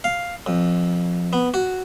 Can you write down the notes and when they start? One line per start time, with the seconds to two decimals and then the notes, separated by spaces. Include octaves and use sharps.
0.04 F5
0.46 F2
1.33 B3
1.54 F#4